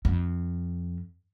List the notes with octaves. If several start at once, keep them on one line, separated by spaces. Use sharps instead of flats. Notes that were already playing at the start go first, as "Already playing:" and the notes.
F2